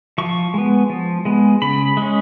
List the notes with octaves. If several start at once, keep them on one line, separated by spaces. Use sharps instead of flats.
F3 C#6
G#3 B3
F3
G#3 B3
C#3 B5
G#3 C#4